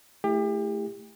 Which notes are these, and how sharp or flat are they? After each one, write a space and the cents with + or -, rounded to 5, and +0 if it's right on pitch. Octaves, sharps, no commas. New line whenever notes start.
A3 +0 E4 +0 G4 +35